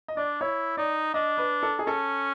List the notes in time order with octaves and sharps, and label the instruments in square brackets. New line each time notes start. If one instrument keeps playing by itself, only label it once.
[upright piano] D#5
[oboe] D4 [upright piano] D5
[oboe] E4 [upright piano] C#5
[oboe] D#4 [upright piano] D5
[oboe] D4 [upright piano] D#5
[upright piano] B4
A4
G#4
[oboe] C#4 [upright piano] A4